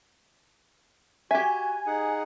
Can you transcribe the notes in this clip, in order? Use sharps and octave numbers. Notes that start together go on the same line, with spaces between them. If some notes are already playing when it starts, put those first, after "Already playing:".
F#4 G4 E5 G#5
D#4 G#4 F#5